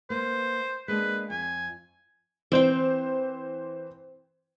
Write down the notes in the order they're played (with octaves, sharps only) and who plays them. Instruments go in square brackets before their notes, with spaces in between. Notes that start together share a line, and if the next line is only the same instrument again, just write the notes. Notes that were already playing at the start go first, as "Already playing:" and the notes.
[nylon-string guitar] A#3 B4 [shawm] C5
[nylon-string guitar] G#3 A#3 D4 [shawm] B4
[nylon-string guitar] F2 [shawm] G#5
[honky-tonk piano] E3 C5 [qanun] C4 G5